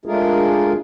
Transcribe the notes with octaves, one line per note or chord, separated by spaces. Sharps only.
G#3 A3 D4 F4 G#4 A#4